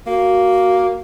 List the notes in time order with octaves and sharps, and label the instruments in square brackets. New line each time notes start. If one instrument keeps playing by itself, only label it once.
[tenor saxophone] A#3 [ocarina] F#4